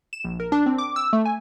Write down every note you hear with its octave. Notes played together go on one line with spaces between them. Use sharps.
E7
A#1
A#4
D4
C4
D6
E6
A3
G#5